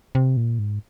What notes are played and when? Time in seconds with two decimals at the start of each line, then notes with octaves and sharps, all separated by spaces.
0.15 C3
0.37 A#2
0.59 G#2